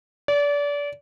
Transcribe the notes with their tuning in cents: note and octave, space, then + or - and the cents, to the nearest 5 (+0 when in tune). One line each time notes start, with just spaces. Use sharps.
D5 -30